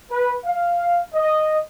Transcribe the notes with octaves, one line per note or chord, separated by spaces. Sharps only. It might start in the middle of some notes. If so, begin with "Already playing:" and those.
B4
F5
D#5